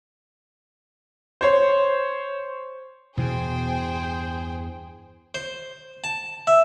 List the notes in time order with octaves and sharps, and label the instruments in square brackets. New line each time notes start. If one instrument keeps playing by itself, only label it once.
[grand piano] C5 C#5 C6
[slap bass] E2 G2 E3 [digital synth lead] B2 [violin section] G#4 C5 G5
[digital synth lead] G6
[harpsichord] C5
A5
[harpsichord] E5 [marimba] E6